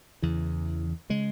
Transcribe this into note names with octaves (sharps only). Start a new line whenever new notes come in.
E2 C#3 E3
C#3 G#3